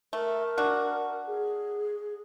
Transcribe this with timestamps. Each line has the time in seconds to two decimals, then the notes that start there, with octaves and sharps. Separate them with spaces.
0.13 A3 A#4
0.58 D4 F#4
1.27 G#4